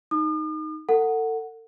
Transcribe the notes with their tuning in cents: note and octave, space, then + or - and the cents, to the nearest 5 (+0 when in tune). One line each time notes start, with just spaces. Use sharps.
D#4 +0 D#6 -45
A4 +40 F#5 +0